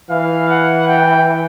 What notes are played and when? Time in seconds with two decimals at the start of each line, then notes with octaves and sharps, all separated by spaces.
0.10 E3 F5
0.49 F#5
0.88 G5